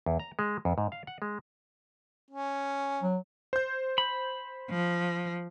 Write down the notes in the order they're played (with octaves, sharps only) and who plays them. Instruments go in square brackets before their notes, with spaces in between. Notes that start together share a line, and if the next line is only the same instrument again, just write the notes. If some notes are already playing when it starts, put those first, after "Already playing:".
[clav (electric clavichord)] E2
A#5
G#3
F2
G#2
F5
F#5
G#3
[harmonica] C#4
[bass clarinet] F#3
[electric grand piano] C5 G6
[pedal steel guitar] B5
[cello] F3